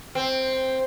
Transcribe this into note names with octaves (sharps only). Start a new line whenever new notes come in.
C4